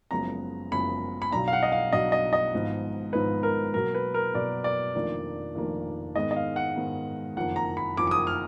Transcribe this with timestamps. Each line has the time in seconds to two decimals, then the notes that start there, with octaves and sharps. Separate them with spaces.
0.11 F#1 F#2 F3 G#3 B3 A#5
0.71 F#1 F#2 F3 G#3 B3 B5
1.22 B5
1.32 B1 B2 F#3 D4 A#5
1.48 F5
1.53 F#5
1.63 D#5
1.72 F5
1.92 B1 B2 F#3 D4 D#5
2.12 D#5
2.33 D#5
2.53 G#1 G#2 F3 B3 D#4
3.13 G#1 G#2 F3 B3 D#4 B4
3.43 A#4
3.74 B2 F#3 A#3 A#4
3.95 B4
4.14 A#4
4.34 B2 F#3 A#3 D5
4.64 D5
4.95 F1 F2 D#3 A#3 D4
5.55 F1 F2 D#3 A#3 D4
6.16 G#2 D#3 G#3 B3 D#5
6.31 D#5
6.36 F5
6.56 F#5
6.76 G#2 D#3 G#3 B3
7.36 F#1 F2 D#3 A#3 F#5
7.56 A#5
7.77 B5
7.97 F#1 F2 D#3 A#3 D6
8.07 D6
8.11 D#6
8.27 F6